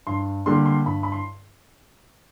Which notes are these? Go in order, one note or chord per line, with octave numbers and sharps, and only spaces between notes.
G2 C6
D3 G3 A#3 C6
C6
G2 B5
B5
C6